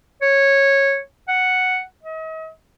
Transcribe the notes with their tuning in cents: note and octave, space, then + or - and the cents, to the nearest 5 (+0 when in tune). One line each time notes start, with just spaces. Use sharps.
C#5 -10
F#5 +0
D#5 +40